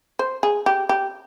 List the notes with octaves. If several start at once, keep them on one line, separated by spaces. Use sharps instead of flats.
C5
G#4
G4
G4